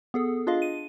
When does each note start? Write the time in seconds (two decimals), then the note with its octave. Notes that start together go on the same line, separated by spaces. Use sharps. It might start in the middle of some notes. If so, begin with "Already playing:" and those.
0.14 B3 G#4 A4
0.47 D4 F4 G#4 D#5 F5
0.62 D#7